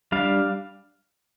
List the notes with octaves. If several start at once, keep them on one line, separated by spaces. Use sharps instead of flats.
G3 D4 F5